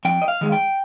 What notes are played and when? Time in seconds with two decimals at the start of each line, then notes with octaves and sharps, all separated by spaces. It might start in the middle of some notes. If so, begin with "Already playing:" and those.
0.05 F2 G5
0.22 D#5
0.28 F5
0.41 D#3 G#3
0.52 G5